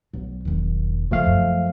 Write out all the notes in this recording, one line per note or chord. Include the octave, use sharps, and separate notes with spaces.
B1 F#3
E1 D#3
C#3 F3 A3 F5
F#2